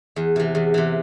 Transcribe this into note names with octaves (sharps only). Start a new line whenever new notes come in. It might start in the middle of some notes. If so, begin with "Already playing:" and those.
E2
C3 E3
E2
C3 E3